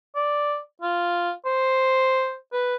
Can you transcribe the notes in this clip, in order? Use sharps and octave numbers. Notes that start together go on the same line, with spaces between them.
D5
F4
C5
B4